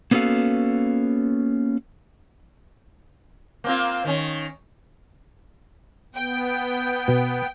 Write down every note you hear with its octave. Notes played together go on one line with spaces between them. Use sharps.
A#3 B3 C#4 F#4 A4 F5
A#3 C4 F4
D#3 C#4
B3 G5
B2